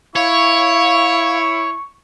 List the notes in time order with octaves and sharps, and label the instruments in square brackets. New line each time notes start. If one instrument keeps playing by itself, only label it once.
[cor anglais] E4 [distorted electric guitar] C#5 [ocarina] F5 [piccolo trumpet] C#6